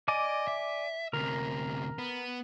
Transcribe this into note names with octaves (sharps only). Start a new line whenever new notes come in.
D5 D#5 G#5 D6
E5
D2 C3 A#4
B3